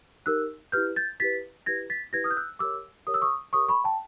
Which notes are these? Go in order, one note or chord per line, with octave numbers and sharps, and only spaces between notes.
D#4 G4 A#4 E6 F#6
E4 G4 B4 F6 G6
G6 A6
E4 G4 B4 A6 B6
E4 G4 B4 G#6 A#6
A6 B6
E4 G4 B4 G#6 A#6
D#6 F6
G6
E6 F#6
G4 A#4 C#5 D6 E6
G4 A#4 C#5 D#6
E6
C#6 D#6
G4 A#4 C#5 C#6 D#6
B5 C#6
G5 A5